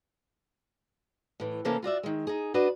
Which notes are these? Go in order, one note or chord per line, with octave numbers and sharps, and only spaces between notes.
A2 E3
C3 E3 A#3 C#4 E4 A4
F4 F#4 D5 E5
D#3 G#3
D#4 G#4
D4 F#4 B4 D5 D#5